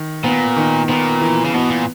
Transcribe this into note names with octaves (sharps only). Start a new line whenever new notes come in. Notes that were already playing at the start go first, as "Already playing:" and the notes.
Already playing: D#3
A#2 B3
D#3
A#2 B3
E3
C#3
B2 B3
A#2